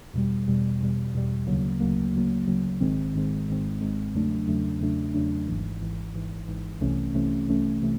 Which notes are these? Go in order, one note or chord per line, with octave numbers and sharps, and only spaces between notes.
E2 B2 G3
E2 B2 G3
E2 B2 G3
E2 B2 G3
D2 C#3 F#3 A#3
D2 C#3 F#3 A#3
D2 C#3 F#3 A#3
D2 C#3 F#3 A#3
G#1 G#2 D#3 G#3 C4
G#1 G#2 D#3 G#3 C4
G#1 G#2 D#3 G#3 C4
G#1 G#2 D#3 G#3 C4
E2 C#3 F#3 A3 D4
E2 C#3 F#3 A3 D4
E2 C#3 F#3 A3 D4
E2 C#3 F#3 A3 D4
G#1 G#2 E3
G#1 G#2 E3
G#1 G#2 E3
G#1 G#2 E3
C2 C3 E3 A3 C#4
C2 C3 E3 A3 C#4
C2 C3 E3 A3 C#4
C3 E3 A3